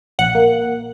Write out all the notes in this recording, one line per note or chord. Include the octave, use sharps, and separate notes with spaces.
A#1 F#5
A#3